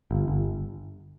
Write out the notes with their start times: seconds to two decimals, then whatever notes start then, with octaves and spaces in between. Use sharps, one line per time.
0.11 G1
0.28 G1